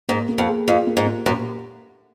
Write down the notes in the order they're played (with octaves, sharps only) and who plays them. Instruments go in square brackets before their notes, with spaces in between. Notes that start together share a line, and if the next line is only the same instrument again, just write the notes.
[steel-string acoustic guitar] G#2 [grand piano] A#3
[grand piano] A#3
[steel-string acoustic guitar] F2
[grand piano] G#4
[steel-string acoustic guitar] F2 [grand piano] F4
[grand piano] A#3
[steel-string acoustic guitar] G#2
[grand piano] A#3
[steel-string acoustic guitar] F#2 [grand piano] A#2